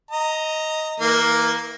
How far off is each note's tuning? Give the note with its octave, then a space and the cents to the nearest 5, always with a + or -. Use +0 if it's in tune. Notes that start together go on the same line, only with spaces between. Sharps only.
D#5 +10 A#5 -15
E3 -25 A#3 +5